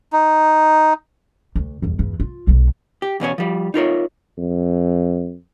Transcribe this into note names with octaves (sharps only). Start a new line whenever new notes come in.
D#4
D2
G1 E2
E2
F4
B1 G#3
G4
E2 B2 C#4 C#5
F3 G3
D#4 F4 A#4 C#5
F2